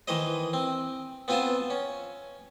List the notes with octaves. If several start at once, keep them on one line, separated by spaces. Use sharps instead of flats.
D#3 E3 B4 C5 D#5
C4
B3 C4 F4 C5 G#5 A5
C#4